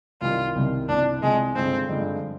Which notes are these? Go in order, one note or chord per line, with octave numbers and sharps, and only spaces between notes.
C2 C3 D#3 G3 F4
C2 C3 D#3 G3
C2 C3 F3 D4
C2 C3 F3 G#3
G2 D3 F3 G#3 C4 D#4
G2 D3 F3 G#3 D#4